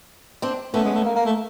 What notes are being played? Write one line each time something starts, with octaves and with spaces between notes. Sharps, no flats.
C4 D4
A3 B3 C#4
G#3
A3
A#3
A#3
A3